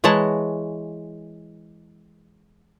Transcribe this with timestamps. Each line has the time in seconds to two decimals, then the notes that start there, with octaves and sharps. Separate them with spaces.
0.04 E3 G#3 C#5 F#5 A5 A#5